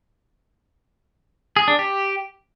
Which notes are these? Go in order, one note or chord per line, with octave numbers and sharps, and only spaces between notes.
G#4
D4
G4